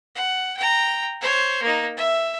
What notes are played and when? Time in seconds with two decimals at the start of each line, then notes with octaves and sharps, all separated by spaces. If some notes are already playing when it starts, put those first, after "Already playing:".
0.15 F#5
0.57 G5 A#5
1.21 C5 C#5
1.62 A#3 D#4
1.97 E5